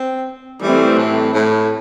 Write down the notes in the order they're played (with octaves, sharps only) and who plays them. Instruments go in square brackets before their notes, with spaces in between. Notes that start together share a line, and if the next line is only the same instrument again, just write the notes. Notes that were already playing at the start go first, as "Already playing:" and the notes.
Already playing: [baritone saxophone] C4
[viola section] E3 A3 C4 [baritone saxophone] G3
[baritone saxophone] A2
A2